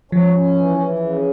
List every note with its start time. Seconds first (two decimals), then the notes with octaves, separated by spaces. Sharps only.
0.12 F3 C#4
0.33 C#4
0.56 E3
0.77 E3
0.99 C#3